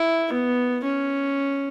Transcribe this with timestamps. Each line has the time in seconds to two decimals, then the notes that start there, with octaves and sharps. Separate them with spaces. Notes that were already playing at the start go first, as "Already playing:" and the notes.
Already playing: E4
0.33 B3
0.84 C#4